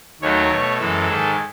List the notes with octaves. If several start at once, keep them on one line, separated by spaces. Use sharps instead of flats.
D#2 D#3 F#3 A3 C#5
B2 A3
F#2 E3 G#3 A4
G#2 D#3 G#3